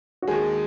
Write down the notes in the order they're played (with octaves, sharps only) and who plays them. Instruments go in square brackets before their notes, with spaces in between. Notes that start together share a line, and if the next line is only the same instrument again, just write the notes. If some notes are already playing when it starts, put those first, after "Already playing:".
[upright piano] F#4
[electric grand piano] D#2 D#3 G#3 [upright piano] G#4